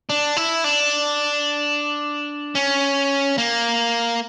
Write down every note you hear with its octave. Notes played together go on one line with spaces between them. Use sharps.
D4
E4
D4
C#4
A#3